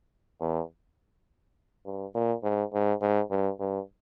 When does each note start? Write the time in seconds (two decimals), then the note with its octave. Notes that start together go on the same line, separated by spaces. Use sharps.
0.41 E2
1.85 G2
2.14 A#2
2.43 G#2
2.73 G#2
3.02 G#2
3.31 G2
3.60 G2